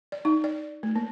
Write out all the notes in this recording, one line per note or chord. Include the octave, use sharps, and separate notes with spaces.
D5
D#4
D5
A3
A#3